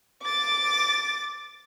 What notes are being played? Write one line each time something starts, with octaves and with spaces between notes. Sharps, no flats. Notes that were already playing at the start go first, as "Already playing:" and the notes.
D6 A6